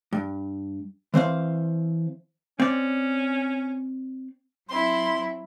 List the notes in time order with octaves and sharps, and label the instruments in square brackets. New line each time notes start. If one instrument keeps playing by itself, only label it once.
[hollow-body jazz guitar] G2
E3 C4 C5 F5
[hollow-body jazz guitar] C4 D5 [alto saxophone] C#4
[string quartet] F#3 C4 E4 [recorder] C6